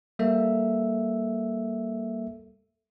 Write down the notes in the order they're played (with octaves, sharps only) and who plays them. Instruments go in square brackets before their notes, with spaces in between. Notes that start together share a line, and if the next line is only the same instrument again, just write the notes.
[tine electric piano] G3 A#3 A4 E5